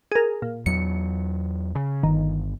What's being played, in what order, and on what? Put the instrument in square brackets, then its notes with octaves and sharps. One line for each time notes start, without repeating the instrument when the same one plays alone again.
[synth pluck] G#4 A#4
A#2
[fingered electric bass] E2 F#3 [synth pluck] C#7
[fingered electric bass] C#3
[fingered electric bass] G1 [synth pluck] D#3